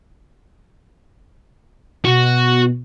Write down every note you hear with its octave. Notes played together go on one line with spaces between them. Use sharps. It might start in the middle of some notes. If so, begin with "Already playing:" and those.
B2 F#4